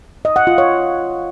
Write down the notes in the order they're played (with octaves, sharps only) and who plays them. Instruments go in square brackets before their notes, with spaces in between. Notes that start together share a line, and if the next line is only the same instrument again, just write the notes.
[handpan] D#5
F#5
F4
C#5